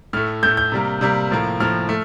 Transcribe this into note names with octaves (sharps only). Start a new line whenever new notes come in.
A2 A3 F6
A2 A3 G6
G6
C3 G3 A#3
C3 G3 A#3
A2 F3 A#3
A2 F3 A#3 F6
A3